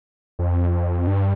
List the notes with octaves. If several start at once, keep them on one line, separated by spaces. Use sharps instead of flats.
F2
G2